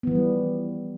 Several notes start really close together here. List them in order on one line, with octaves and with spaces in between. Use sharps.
B3 E3 F3 G3